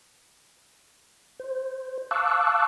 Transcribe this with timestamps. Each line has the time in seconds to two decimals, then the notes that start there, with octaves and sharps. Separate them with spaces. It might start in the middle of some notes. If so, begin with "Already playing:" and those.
1.40 C5
2.11 F5 A5 C#6 D6 E6 F#6